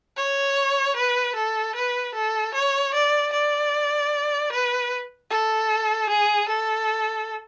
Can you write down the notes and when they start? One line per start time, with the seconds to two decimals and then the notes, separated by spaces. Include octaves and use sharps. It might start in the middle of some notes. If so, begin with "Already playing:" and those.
0.17 C#5
0.96 B4
1.35 A4
1.75 B4
2.15 A4
2.54 C#5
2.94 D5
3.33 D5
4.52 B4
5.31 A4
6.09 G#4
6.49 A4